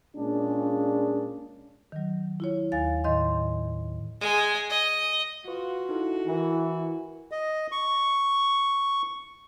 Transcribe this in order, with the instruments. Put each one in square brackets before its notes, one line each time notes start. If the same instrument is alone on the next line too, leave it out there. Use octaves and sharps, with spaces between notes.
[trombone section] A#2 G#3 C#4 D4 F4 G#4
[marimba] D#3 F#3
E4 F4 C#5
D#2 F5 G#5 A6
A2 D#3 D#5 C6
[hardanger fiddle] G#3 G#5
D#5
[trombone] F4 [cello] F#4 [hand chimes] B4 C#6
[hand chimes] D#4 E4 A4
[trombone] E3 [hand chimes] E4 A#4
[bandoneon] D#5
C#6